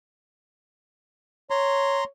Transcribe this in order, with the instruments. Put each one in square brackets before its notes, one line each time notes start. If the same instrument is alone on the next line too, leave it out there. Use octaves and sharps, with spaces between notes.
[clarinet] C#5 [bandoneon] A#5 C6